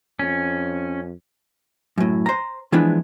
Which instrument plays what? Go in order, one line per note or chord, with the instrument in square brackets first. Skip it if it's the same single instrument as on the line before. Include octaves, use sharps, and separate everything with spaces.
[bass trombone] F2 [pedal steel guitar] C#4
[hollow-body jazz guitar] F#2 A2
C5 A#5
E3 F3 G#3 B3 D4 E4